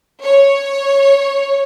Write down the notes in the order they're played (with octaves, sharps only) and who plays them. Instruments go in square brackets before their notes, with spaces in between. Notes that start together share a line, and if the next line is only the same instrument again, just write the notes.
[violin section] C#5